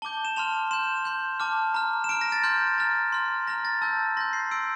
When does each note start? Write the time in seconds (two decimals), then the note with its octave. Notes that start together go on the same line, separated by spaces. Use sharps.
0.02 A5 D6 G6 G7
0.25 E7
0.36 A5 C6 F6 F7
0.71 C6 G6 E7
1.05 C6 G6
1.40 A5 D6 F6
1.74 A#5 F6
2.04 E7
2.09 A#5 F6 D7
2.21 A#6
2.32 A6
2.43 C6 F6 G6
2.78 A#5 F6 A6
3.12 C6 F6
3.47 A#5 F6 A#6
3.65 A6
3.82 A5 E6 G6 A6
4.17 C6 A#6
4.20 G6
4.33 C7
4.51 C6 E6 G6 D7